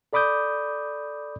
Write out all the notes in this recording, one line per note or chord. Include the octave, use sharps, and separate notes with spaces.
A4 D5 B5 D6 D#6 G6